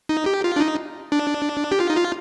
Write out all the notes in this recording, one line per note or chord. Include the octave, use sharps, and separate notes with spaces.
D#4
G4
F4
D4
D#4
D4
G4
F4
D#4
F4